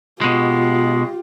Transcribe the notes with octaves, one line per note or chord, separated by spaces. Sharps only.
B2 G#3 F4 G4